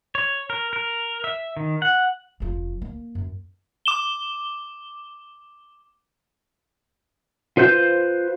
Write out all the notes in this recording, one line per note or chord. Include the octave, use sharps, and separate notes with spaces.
C#5
A#4
A#4
E5
D#3
F#5
F1 F3
A#3
F#2
D6 E7 G7
F4 B4 C5 G6